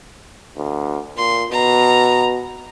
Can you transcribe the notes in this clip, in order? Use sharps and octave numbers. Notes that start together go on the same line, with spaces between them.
D2
A#2 C6
B2 A#5